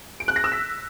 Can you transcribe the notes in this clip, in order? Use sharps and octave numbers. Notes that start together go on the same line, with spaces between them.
D7
F#6
A#6
E6
B6